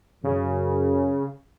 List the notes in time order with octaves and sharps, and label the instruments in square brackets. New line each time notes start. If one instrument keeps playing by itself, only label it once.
[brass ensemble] F#2 [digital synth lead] C#3